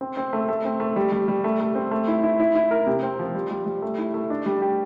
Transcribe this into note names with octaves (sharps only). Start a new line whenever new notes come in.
C4
C4
A3
A3
C4
A3
G3
G3
G3
A3
A3
C4
A3
E4
E4
E4
E4
A#4
C3
C4
F3
G3
G3
G3
A3
E4
A3
D4
G3
G4